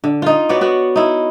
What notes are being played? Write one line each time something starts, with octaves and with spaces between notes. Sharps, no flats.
D3
D#4 F4
B3 F#4 C#5 D5
B3 F#4
D#4 E4